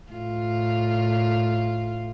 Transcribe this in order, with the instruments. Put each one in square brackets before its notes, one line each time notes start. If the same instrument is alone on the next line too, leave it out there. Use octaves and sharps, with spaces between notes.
[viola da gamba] A2 F4